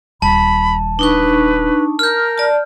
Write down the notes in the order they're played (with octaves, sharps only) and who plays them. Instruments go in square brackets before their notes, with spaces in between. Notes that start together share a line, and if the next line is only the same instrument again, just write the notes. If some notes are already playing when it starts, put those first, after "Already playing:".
[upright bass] D#1 [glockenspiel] A5 [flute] B5
[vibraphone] D4 D#4 C#6 [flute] B4
[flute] A#4 [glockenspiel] F6 G6
[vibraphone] D5 A5